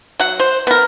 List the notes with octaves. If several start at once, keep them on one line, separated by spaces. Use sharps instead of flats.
F#3 F#5
C5
B3 A#4